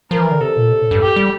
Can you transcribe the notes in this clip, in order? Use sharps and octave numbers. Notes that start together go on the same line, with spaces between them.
F3 A#4
E3
D3
C3 A4
A#2
C3
A2
G2
G4
G3